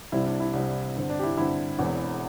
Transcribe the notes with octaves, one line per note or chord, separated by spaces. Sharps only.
C2 C3 G3 C4 E4
D4
E4
C2 C3 G3 C4
G2 D3 C4
D4
G4
E4
G2 D3 C4 E4
E1 E2 E3 C4